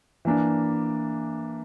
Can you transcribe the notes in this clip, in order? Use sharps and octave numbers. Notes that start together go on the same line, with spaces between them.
E3 A#3 D4